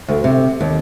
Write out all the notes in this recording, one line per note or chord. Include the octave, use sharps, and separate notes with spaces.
D2
C3
D#2